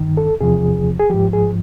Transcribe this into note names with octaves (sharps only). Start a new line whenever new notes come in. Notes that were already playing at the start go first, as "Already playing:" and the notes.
Already playing: G2 D#3
A4
E2 C3 F3 G#4
G#4
G#2 F3 G4
G#4